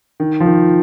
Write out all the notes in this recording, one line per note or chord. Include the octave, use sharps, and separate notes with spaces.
D#3
F3
D#3